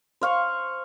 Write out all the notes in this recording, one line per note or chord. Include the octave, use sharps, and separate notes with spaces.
C5 F5 C#6